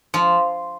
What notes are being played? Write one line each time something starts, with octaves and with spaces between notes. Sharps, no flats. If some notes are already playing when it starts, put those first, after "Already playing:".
F3